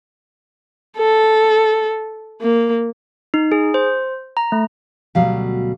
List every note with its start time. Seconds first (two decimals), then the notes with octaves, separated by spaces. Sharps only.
0.98 A4
2.42 A#3
3.34 D#4
3.52 G#4
3.74 C5
4.37 A#5
4.52 A3
5.15 D2 B2 F#3 G3 F5